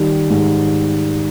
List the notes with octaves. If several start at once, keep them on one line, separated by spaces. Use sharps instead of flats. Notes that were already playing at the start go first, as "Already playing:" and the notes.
Already playing: D#3 G3
G#2